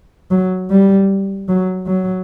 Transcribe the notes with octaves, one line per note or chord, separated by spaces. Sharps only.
F#3
G3
F#3
F#3